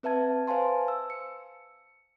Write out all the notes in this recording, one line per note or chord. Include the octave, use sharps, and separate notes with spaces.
C4 B4 E5 A5 G#6
B4 C5 F5 G#5 A5 C6
E6
C#7